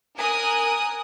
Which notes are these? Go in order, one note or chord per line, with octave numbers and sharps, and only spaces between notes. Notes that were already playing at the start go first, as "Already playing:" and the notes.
A#4 G#5 D#6 F#6